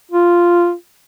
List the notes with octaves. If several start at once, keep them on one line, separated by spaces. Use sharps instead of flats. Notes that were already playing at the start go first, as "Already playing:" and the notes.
F4